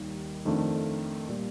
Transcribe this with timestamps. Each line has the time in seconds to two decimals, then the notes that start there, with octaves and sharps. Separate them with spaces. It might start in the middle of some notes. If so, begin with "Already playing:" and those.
Already playing: D#2 D#3 G3
0.45 F2 D#3 A3 D4 F4
1.29 A#2 G3